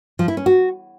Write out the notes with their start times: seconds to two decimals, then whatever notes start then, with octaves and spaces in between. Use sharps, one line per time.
0.19 F3
0.28 E4
0.37 C#4
0.46 F#4